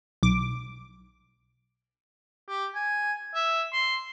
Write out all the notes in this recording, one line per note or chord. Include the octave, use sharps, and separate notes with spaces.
B1 D6
G4
G#5
E5
C6